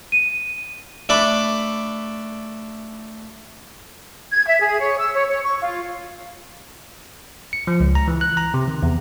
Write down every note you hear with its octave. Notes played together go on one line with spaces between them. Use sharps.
D#7
A3 D4 B5 D6
G#6
E5
G#4
C#5
E6
C#5
C#5
C#6
F4
C#7
F3
C#2
A#5
E3
F#6
A#5
C3
D#3
E2